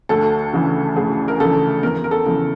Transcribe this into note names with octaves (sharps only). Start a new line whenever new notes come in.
D2 A4
C#3 E3
D2 G#4
A#4
C#3 E3 A4
E2 A#4
A#4
A4
C#3 E3